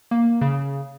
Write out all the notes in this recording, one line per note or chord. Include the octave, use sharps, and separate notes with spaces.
A#3
C#3